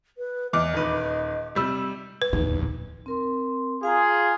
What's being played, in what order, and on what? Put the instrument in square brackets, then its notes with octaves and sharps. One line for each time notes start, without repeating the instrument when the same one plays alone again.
[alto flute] B4
[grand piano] E2 D6 [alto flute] D#5
[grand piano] D#1 D#3 B4
C3 G3 E6
[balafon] B4
[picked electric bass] D1 A#1 [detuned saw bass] E2 [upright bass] D#4
[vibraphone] C4 A#4 C6
[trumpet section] F4 G#4 [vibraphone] F5 G#5 A#5